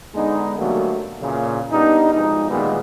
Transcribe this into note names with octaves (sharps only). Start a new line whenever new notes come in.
D3 G#3 B3 D4 D#4
B2 D3 F#3 G3 A3 A#3
A#2 C#3 E3
G3 B3 D4 D#4
F2 B2 G#3 D#4
A#2 D#3 E3 G3 G#3 B3